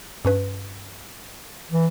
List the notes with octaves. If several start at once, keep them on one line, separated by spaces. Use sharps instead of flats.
G2 C#4 B4
E3